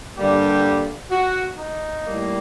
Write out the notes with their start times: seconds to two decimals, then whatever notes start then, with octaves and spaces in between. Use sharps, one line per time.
0.18 G2 D3 G3 A#3 G4
1.11 F#4
1.58 D#4
2.04 A2 G3 A#3